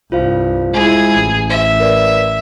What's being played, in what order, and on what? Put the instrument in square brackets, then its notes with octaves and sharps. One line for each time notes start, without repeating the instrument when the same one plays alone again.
[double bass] C2 G2 [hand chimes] F4 C5 F5
[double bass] G#3 E4 [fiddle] G#4
[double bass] A1
[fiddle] E5
[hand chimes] A#4 B4 D5